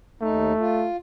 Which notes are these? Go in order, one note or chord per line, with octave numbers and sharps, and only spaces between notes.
D#2 A3 D#4
F4